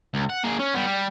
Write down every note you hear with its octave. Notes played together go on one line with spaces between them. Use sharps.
C#2
F#5
A#3 G#4
C#4
G3 B3
G3